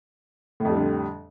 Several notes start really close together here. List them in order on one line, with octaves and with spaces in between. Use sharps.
A2 F2 G3 D3